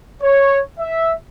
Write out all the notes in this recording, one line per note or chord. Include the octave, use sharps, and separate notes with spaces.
C#5
E5